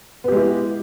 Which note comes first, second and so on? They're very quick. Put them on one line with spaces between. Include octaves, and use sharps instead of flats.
B3 G4 G#3 E4